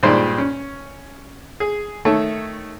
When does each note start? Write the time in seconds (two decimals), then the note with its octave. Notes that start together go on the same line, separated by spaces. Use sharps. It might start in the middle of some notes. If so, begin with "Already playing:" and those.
0.03 G2 A#2 D#3 G#3 C5 D5
0.38 C#4
1.60 G#4
2.05 D#3 A3 A4 C#5